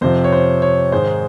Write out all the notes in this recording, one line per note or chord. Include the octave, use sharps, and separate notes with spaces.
F2 C3 F3 C5
C#5
C5
C#5
G#2 D#3 G#3 C5